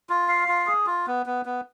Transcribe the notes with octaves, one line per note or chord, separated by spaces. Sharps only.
F4
F5
F4
G#4
F4
B3
B3
B3